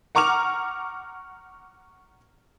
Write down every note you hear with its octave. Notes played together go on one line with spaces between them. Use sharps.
F#5 A#5 C#6 D6 F6 F7